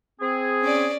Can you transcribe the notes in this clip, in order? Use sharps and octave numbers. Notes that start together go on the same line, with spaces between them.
C4 G#4
C#4 D5